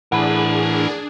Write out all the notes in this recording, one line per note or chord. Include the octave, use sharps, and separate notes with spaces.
A2 E3 D4 G#4 A#4 F#5 B5